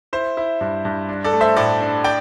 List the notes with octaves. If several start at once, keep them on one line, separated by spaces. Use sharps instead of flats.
E4 C5
E4
G2
G2
D4
A4 D5
A3
C5 E5
A2 A4 D5
D4
D5 G5